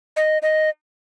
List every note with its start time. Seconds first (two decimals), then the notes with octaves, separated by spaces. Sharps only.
0.16 D#5
0.42 D#5